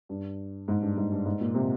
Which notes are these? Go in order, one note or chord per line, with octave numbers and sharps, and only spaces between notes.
G2
G#2
G2
G#2
G2
G#2
A#2
C3